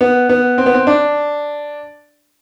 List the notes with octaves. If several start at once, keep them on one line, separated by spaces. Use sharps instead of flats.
B3
B3
C4
B3
C4
D4